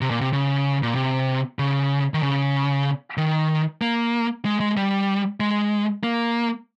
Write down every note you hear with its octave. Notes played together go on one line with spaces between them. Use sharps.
C3
A#2
C3
C#3
A#2
C3
C#3
D#3
C#3
D#3
A#3
G#3
G#3
G3
G#3
A#3